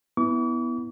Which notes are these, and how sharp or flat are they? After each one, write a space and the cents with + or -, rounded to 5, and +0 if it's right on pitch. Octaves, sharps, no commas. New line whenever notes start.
B3 +0 E4 -15 D6 -45